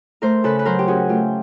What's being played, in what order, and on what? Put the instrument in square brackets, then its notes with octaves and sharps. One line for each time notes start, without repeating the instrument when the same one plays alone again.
[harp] A3 A#4 C5
C#3 A4 B4
B4
F#3 A#4 C5
G4
C#4 F#4 G#4
A3 F4 G4